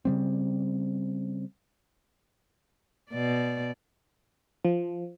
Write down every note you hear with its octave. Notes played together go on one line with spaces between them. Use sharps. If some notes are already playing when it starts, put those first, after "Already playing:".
C#3 G3 C4
B2 D5
F3